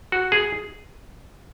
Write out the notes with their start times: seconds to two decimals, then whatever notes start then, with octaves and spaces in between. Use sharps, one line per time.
0.12 F#4
0.32 G#4